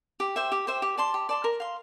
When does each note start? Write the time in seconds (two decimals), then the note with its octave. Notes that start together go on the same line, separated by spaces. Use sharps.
0.20 G4
0.36 C5 E5 G5
0.52 G4
0.67 C5 E5 G5
0.82 G4
0.97 D5 A5 C6
1.14 G4
1.29 D5 A5 C6
1.44 A#4
1.60 F5 C6